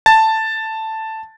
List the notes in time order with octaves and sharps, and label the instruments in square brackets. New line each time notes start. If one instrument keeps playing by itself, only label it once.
[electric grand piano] A5 A6